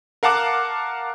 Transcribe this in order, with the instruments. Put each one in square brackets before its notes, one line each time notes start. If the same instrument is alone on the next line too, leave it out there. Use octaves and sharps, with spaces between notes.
[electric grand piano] A#4 F5 F#5 A5 D6 F#6